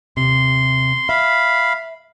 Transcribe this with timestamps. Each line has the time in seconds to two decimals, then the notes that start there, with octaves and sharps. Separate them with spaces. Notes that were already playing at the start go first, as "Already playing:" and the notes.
0.17 D#2 C3 C6
1.09 E5 F5 B5